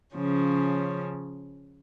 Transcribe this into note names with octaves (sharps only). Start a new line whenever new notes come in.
C#3 F3 C#4